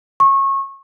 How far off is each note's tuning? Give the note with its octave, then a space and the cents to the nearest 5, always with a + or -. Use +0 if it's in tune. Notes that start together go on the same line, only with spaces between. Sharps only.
C#6 -25